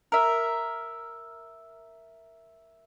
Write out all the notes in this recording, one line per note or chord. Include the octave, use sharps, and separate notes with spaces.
A#4 E5